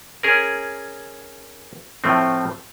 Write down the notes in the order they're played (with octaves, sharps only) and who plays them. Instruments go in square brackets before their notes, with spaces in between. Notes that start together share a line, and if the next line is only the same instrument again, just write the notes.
[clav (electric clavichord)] C#4 G#4 A#4
A2 F3 A3 C4